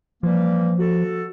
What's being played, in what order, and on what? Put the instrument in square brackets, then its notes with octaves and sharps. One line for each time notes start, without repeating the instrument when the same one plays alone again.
[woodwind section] E3 G3 A#3 [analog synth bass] F3
[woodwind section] F#4 A4